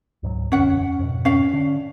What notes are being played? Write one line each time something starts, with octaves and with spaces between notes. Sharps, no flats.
C#2 G#2 F#3
E1 F#2 D3 C#4 F#5
F2 G#2 B2
C#4 F5
D3 D4